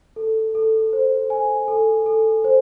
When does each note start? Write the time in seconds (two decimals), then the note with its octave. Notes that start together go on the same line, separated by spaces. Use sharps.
0.16 A4
0.55 A4
0.93 C5
1.30 G#5
1.68 A4
2.06 A4
2.44 C5